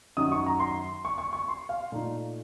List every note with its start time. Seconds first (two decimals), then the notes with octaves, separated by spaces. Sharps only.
0.17 F#2 D#3 F#3 D#6
0.32 C#6
0.46 A#5
0.60 C6
1.05 C#6
1.18 C#6
1.33 C#6
1.48 C6
1.69 F5
1.92 A#2 A3 D#4